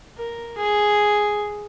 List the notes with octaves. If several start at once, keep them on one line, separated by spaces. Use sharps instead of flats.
A#4
G#4